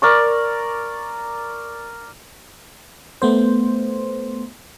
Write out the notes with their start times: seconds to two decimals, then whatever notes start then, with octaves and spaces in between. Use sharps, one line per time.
0.02 A#4 D5 C#6
3.22 A3 B3 C5